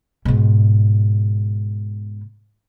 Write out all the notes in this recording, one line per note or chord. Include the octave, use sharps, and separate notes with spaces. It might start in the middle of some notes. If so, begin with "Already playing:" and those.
G#2 B2